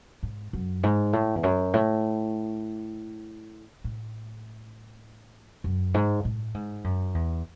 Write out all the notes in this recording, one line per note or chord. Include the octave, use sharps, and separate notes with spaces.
G#2
F#2
G#2
A2
E2
F#2
A2
A2
F#2
G#2
A2
G#2
F#2
E2